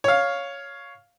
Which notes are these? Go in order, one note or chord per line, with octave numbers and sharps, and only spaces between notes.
C#5 F5